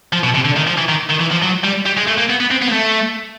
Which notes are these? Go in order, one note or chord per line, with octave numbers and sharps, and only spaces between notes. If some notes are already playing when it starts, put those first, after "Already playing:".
F3
B2
C3
D3
D#3
F3
E3
D#3
D#3
E3
F3
F#3
G3
G3
G#3
A3
A#3
B3
B3
C4
B3
A#3
A3